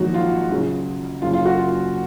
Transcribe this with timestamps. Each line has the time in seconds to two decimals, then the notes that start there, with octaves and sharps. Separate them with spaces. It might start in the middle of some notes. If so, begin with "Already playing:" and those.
Already playing: A#1 G#2 D#3 F#3 F#4
0.14 F4
0.50 C#2 C#3 F#3
1.22 F#1 F#2 C#3 F4
1.33 F4
1.45 F#4
1.58 F4